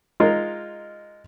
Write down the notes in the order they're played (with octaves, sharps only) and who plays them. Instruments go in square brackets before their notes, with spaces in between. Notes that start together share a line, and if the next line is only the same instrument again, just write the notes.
[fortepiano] G#3 D#4 F4 A#4